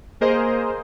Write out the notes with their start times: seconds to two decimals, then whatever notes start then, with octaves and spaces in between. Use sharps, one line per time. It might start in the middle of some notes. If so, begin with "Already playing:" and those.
0.21 A#3 G#4 A#4 C5 D#5